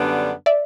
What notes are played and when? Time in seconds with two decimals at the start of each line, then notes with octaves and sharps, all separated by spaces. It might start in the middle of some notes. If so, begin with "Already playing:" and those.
Already playing: F#2 D3 G3 B3 D4
0.46 D5 E5